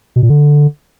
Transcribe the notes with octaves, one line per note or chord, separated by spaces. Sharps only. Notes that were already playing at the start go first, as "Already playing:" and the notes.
B2
A#2
D3